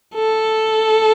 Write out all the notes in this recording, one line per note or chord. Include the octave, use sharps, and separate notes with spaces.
A4